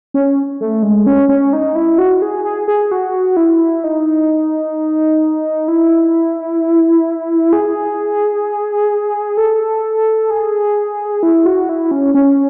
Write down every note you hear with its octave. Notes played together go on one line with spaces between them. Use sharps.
C#4
A3
G#3
C#4
C#4
D#4
E4
F#4
G#4
G#4
G#4
F#4
E4
D#4
E4
G#4
A4
G#4
E4
F#4
E4
C#4
C#4